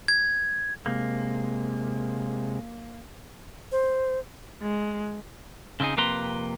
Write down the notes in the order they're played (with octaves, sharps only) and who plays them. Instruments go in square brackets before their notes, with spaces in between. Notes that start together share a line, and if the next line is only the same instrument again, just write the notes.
[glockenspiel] G#6
[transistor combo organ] C3 G#3 [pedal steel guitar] A#3
[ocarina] C5
[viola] G#3
[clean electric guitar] C#3 C4 C#4 D#4 G#4
F2 C3 A#3 B4 A#5 C6